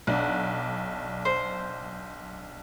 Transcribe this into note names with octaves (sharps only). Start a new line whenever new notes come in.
B1 D4 F#5
C5